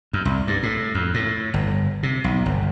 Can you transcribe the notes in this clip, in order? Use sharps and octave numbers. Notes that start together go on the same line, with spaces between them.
F#2
C2
G2
A2
F2
A2
G1
C3
B1
G1